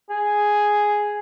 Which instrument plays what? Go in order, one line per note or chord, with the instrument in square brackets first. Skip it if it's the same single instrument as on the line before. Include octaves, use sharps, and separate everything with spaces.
[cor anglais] G#4